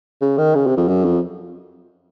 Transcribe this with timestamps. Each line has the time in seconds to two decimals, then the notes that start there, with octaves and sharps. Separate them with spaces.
0.21 C#3
0.38 D#3
0.55 C#3
0.67 C3
0.77 F2
0.88 F#2
1.05 F2